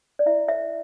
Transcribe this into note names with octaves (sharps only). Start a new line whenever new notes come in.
D5
E4 E5
A4 C5 E5